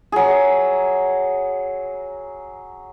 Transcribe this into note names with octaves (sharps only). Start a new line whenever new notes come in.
F#3 G#4